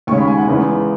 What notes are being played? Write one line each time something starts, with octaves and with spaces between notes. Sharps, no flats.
D#2 C#3 G#3 C#4 C#6
B5
G#5
F#5
E2 C#3 G#3 B3 E4